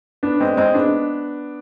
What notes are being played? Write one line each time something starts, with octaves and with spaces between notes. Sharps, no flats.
B3 D4
G#3 C4
G#3 C4
B3 D4